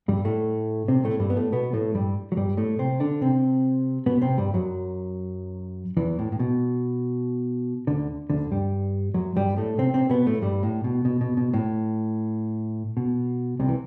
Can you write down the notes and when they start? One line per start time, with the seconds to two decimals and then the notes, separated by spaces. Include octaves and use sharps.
0.08 G2 G3
0.25 A2 A3
0.88 C3 C4
1.04 A2 A3
1.20 G2 G3
1.30 B3
1.36 A2 A3
1.52 B2 B3
1.73 A2 A3
1.94 G2 G3
2.32 F#3
2.37 G2 G3
2.57 A2 A3
2.79 C3 C4
3.00 D3 D4
3.21 C3 C4
4.06 B2 B3
4.22 C3 C4
4.38 G2 G3
4.54 F#2 F#3
5.97 E2 E3
6.19 A2
6.32 A2
6.40 B2
7.87 D2 D3
8.30 D2 D3
8.51 G2 G3
9.14 F#2 F#3
9.36 G2 G3
9.57 A2 A3
9.78 C3 C4
9.94 C3 C4
10.10 B2 B3
10.26 A2 A3
10.41 G2 G3
10.63 A2
10.84 B2
11.05 B2
11.21 B2
11.37 B2
11.54 A2
12.97 B2
13.60 C2 C3
13.69 E3